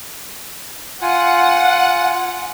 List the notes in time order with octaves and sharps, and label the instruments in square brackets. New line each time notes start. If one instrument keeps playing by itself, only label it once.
[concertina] F4 G#5 [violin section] F#5